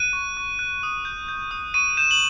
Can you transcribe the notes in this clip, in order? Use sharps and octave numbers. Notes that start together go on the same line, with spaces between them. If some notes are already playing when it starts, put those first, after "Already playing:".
Already playing: F#6 D#7
C#6
C#6
F#6
D#6
G6
G6
D#6
C#6 D#7
G6 E7
F#7